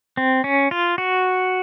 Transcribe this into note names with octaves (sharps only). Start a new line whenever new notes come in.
C4
C#4
F4
F#4